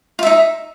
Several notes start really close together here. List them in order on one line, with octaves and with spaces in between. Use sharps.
F4 E5 D#4